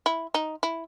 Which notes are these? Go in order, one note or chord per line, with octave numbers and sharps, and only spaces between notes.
E4
D#4
E4